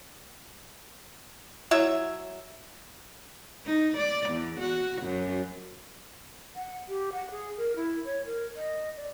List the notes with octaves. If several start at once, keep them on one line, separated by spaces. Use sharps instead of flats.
F#3 E4 E5
D#4
D5
E2
F#4
F#2
F#5
G4
F#5
G#4
A#4
E4
C#5
A#4
D#5
D5